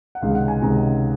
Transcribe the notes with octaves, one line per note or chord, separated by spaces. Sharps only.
F#5
C#2 C3 D#3 G#3 C#4 F5
F#5
G#5
C#2 C3 D#3 G#3 C#4 A#5